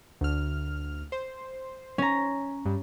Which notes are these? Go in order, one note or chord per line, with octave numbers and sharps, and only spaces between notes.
D2 F6
C5
C#4 A#5
G2